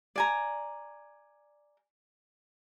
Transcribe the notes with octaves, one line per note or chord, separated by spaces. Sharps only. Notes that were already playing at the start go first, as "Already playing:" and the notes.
D5 G#5 A#5